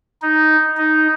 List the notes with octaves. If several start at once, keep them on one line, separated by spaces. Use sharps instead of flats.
D#4
D#4